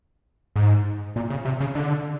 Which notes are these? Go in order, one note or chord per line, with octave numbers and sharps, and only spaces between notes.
G#2
A#2
C#3
C3
C#3
D3